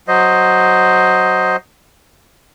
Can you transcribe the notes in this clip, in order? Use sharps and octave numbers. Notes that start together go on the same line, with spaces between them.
F#3 C5 D#5